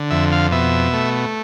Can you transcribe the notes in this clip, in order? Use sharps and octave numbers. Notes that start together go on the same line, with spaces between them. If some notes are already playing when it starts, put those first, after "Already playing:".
Already playing: D3
F2 E5
F5
B2 E5
A3